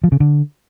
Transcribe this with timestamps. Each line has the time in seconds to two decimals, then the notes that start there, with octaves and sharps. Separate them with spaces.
0.04 F3
0.12 C#3
0.20 D3